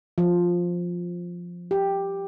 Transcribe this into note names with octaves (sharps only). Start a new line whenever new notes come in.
F3
G4